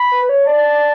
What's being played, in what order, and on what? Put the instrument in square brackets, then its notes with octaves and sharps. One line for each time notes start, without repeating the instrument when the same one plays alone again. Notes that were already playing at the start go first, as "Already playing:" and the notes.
Already playing: [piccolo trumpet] B5
[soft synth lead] B4
B4
C#5
[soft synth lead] D5 [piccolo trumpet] A5